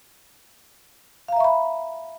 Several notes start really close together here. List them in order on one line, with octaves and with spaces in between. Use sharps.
F5 A#5 E5 C#6 B5